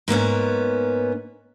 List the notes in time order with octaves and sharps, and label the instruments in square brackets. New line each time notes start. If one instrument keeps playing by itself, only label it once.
[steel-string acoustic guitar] G#2 A#3 B3 C#4